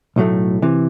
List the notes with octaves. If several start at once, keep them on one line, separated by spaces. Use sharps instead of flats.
B1 A2 F#3 A3
C3 E3